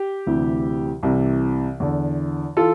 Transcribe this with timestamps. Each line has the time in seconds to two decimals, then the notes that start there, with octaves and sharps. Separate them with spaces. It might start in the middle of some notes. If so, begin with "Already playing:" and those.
Already playing: G4
0.27 D2 C3 E3
1.03 C2 C3 E3
1.80 E2 D3
2.57 E3 F4 A4